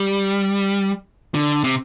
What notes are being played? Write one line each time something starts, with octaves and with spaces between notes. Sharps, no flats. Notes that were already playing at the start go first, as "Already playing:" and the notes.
Already playing: G3
D3
C3